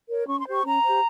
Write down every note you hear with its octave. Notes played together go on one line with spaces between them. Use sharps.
A#4 C#5
C#4 C#6
C6
G4 C5 C#6
C#4 A#5
G4 C5